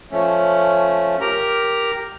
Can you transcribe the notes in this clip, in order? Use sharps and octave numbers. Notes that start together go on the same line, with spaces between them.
F3 A3 C#4
G4 A#4 A#5